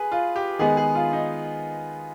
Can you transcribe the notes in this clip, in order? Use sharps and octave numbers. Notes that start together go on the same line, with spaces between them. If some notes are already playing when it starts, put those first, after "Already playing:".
Already playing: G#4 B4
F4
G4
D#3 G#3 B3 G#4
G#4
F4
D#4